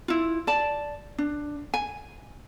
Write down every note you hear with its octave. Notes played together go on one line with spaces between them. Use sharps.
E4 F4
D5 A5
D4
G#5